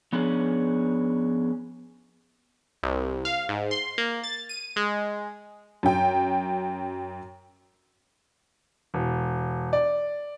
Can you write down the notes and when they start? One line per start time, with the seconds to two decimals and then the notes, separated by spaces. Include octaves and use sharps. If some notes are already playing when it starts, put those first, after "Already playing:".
0.13 F3 B3 C#4 D4 G#4
2.83 C2
3.25 F5
3.49 G#2
3.71 C6
3.98 A#3
4.24 A6
4.49 D#7
4.76 G#3
5.83 F#2 G5
8.94 E1
9.73 D5